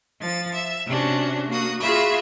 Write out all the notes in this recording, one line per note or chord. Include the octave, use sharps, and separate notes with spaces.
F3 A6
E5
C3 C#4 D4 F#4
A#3 F#4 D#6
F4 F#4 G#4 E5 B5